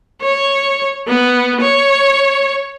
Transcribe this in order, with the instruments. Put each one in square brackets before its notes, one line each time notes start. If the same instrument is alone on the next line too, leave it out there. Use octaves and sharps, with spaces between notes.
[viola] C#5
B3
C#5